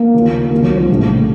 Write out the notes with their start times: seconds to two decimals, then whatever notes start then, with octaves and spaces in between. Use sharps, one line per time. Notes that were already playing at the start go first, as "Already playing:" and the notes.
Already playing: A#3
0.14 D#2 C#3 F3
0.51 C2 C3 D#3 A#3
0.64 F#3
0.77 F3
0.89 A#1 A2 C3 A3
1.02 C#3